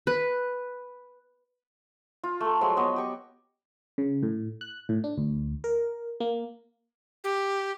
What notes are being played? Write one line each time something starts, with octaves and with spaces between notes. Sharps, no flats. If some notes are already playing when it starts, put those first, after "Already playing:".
B4
F4
A3 A4
F3 F#3 G#3 C6
B3 F#4 D#5
G4 C#6
C#3
A2
F#6
A2
D4
D2
A#4
A#3
G4